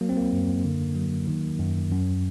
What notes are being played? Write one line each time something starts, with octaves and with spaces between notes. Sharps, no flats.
F#3 A#3
C4
A#3
F#2
D3
F#3
D#3
F#2
F#2